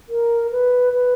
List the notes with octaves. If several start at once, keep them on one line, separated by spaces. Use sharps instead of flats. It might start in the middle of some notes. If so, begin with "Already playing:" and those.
A#4
B4
B4